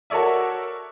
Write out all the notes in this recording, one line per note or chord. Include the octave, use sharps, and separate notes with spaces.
F#4 A4 A#4 C#5 D5 E5